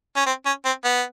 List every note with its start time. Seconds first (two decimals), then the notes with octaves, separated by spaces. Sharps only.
0.16 C#4
0.26 C4
0.46 C#4
0.65 C4
0.84 B3